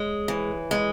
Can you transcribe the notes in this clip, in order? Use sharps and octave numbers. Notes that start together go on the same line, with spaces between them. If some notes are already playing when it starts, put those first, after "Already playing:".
Already playing: G#3 C#5
E3
G#3